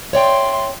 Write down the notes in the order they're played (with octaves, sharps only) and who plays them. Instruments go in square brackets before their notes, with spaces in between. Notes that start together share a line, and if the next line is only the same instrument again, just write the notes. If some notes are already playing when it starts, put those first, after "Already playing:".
[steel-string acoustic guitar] C#5 D5 G5 [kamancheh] E5 C6